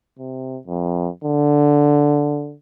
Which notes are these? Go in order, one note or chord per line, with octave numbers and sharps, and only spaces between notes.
C3
F2
D3